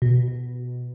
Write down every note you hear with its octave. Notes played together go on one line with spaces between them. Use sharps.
B2
B2